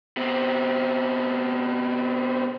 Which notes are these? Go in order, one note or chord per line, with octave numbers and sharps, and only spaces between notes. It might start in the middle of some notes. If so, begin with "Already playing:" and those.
B2 C4